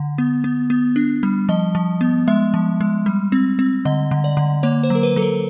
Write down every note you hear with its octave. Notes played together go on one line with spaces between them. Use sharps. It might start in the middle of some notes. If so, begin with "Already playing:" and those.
Already playing: D3
B3
B3
B3
D4
G3
F3 D#5
F3
B3
G#3 E5
F3
G#3
G3
C4
C4
D3 D#5
D3
D5
D3
A#3 C#5
C5
F#3 A#4
B4
F#3 A4
A#4